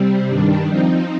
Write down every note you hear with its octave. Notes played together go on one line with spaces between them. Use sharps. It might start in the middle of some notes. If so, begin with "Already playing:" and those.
Already playing: C3 G3 C4
G2 D#3 G3 D4
F3 C4 D#4